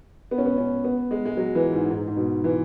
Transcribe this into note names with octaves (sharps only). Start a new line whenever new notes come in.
B3
C#4
B3
C#4
B3
G#3
G#3
F#3
E3
G#2
G#2
G#2
B2
E3